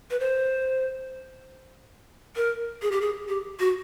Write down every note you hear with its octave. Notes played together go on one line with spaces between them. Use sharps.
B4
C5
A#4
G#4
G4
G#4
G4
F#4